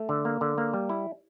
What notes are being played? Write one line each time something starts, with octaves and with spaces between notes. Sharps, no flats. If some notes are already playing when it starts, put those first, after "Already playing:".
Already playing: A3
D3
A#3
D3
A#3
G3
E4